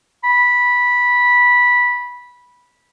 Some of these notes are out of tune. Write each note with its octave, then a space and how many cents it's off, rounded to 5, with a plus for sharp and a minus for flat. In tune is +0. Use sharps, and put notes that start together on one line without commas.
B5 -10